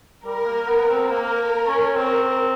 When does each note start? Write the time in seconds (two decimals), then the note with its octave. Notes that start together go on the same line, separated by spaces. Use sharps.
0.25 G3 A#4
0.46 A#3
0.67 B3
0.89 C4
1.10 A#3 A#4
1.67 C#4
1.96 C4 A#4